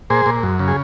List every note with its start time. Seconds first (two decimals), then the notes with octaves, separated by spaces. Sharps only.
0.10 A#2 G#4 C5
0.26 A#2
0.43 F#2
0.59 C#3
0.68 G#4